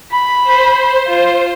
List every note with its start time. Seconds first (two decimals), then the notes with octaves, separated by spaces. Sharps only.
0.11 B5
0.44 C5
1.07 F4